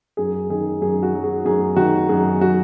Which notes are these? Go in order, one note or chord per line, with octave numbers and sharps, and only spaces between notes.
F#2 G#4
D#3 G#4
F#2 G#4
F#4
F#3
G#4
F#2 G#4
D#3 F#4
F#2 G#4
F#3 F#4